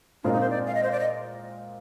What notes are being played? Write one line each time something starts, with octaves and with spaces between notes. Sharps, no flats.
A#2 G#3 C4 D4 F4 A#4
D#4
C5
D5
F5
D#5
C5
D5
D#5